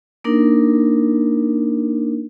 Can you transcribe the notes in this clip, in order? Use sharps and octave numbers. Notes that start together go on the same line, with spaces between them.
A#3 D4 D#4 A#4